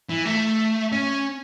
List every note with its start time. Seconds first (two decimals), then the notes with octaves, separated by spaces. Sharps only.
0.10 E3
0.26 A3
0.92 C#4